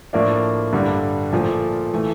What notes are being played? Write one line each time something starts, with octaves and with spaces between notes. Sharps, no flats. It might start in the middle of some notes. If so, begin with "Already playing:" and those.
A2 F3 A#3 D4
G2 D3 G3
A#2 F3 A3
E3 A3